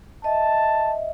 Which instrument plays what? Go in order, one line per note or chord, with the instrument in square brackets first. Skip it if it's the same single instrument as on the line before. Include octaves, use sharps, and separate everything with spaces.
[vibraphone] D#5 E5 [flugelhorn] A5